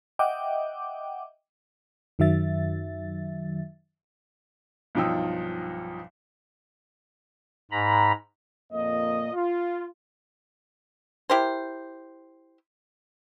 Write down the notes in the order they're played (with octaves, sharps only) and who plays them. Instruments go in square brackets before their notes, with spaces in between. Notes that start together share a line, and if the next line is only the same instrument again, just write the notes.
[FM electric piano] D#5 E5 F#5 G5 D6
F#2 D#3 F#3 E5 A6
[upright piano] B1 G2 F3 D#4 G5 E6
[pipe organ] G#2 A#5 B5
[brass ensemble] F2 A#2 A#3 D#5
F4
[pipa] E4 G4 A#4 C5